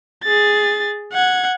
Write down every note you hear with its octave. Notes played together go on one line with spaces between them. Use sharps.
G#4 A6
F#5 G#6